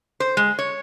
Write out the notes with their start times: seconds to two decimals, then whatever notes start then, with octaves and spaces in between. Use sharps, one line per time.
0.20 C5
0.37 G#3
0.59 C#5